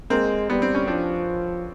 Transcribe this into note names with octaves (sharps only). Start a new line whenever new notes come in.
G#3 A#3 C4
G3 B3
C4
C#4
F3 C4 D4